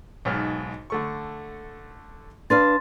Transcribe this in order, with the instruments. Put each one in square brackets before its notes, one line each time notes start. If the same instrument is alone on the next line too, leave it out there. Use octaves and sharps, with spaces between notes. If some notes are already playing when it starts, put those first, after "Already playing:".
[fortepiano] B1 G#2 F6
D3 A3 C#6
[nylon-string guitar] D4 B4 F5 [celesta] C6 A6